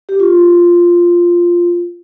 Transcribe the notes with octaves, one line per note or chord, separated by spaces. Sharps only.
G4
F4